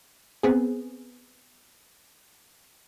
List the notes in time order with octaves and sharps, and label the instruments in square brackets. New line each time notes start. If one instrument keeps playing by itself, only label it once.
[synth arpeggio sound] B3 C4 G#4